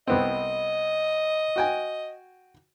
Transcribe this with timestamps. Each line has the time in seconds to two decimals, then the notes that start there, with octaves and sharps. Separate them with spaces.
0.07 C2 B3 C4 D#5
1.56 F#4 G5 G#5